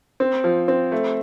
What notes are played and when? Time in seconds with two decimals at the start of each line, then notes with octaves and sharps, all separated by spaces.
0.20 C4
0.44 F3
0.68 C4
0.92 A3